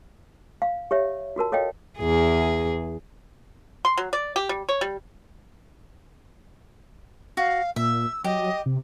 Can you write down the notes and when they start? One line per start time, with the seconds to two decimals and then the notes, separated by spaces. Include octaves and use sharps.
0.62 F5
0.91 G4 C#5 E5
1.36 F4 F#4 A#4 A5
1.52 A4 C#5 D#5 F5 G5
1.99 E2 G#4
3.85 C6
3.98 F#3
4.13 D5
4.36 G4
4.49 G3
4.69 C#5
4.81 G3
7.37 F#4 F5
7.76 A#2 E5 E6
8.24 F#3 G4 D#5
8.66 C3